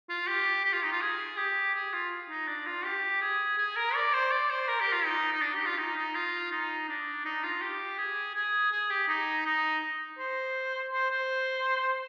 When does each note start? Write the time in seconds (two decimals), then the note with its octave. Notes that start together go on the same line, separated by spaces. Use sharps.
0.09 F4
0.27 G4
0.65 G4
0.73 F4
0.83 D#4
0.92 F4
1.01 G#4
1.37 G4
1.75 G#4
1.93 F4
2.30 D#4
2.48 D4
2.67 F4
2.85 G4
3.21 G#4
3.58 G#4
3.76 A#4
3.95 D5
4.13 C5
4.31 D5
4.50 C5
4.68 A#4
4.80 G4
4.92 F4
5.05 D#4
5.33 D#4
5.41 D4
5.55 G4
5.66 F4
5.78 D#4
5.96 D#4
6.15 F4
6.51 D#4
6.89 D4
7.25 D#4
7.43 F4
7.62 G4
7.98 G#4
8.35 G#4
8.72 G#4
8.90 G4
9.08 D#4
9.46 D#4
10.19 C5
10.92 C5
11.11 C5